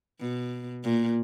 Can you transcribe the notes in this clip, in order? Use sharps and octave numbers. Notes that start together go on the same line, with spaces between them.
B2
A#2